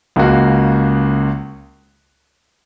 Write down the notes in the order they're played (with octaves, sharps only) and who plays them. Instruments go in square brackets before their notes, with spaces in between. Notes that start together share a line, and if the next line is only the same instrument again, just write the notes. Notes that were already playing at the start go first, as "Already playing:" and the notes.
[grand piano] C#2 C#3 A#3 F#4